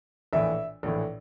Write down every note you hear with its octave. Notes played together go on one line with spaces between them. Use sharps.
A#1 A2 E3 E5
A#1 A2 E3